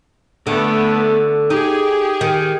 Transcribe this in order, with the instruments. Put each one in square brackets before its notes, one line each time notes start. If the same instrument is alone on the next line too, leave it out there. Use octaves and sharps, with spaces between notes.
[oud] D3 [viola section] A3 B3
[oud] D#4 [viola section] G4 G#4
[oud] D#3